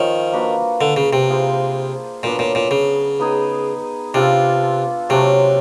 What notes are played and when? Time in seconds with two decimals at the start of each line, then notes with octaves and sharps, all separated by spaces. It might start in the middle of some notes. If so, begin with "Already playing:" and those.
Already playing: D#3 F3 C#4
0.32 A#3 D4 F#4 B4
0.81 D3
0.97 C#3
1.13 C3
1.28 D4 F4 G#4 C5
2.23 A#2 F#3 B3 D4
2.39 A#2
2.55 A#2
2.71 C#3
3.19 B3 D#4 G#4
4.14 C3 D4 F4 A4
5.09 C3 F#3 A3 D4